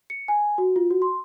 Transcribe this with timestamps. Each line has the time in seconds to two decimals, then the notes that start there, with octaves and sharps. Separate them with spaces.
0.10 C#7
0.28 G#5
0.58 F#4
0.76 F4
0.91 F#4
1.02 C6